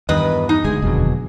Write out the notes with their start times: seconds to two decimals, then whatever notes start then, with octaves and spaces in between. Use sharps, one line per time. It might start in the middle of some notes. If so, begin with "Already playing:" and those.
0.09 E2 G2 D#3 B4 D#5
0.49 D#4
0.64 F#1 D2 G#3 G#4
0.82 F1 D#2 B2 D3 F#3